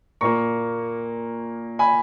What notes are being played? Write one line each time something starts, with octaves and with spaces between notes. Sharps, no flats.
A#2 A#3 A#5 C#6
G#5 B5